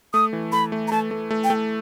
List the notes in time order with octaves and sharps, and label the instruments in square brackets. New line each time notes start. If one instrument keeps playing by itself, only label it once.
[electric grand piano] A3 [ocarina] D#6
[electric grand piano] E3
[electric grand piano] A3 [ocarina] B5
[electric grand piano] A3
[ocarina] A#5
[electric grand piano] A3 [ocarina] A5
[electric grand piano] A3
A3
[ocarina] G5
[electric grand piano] A3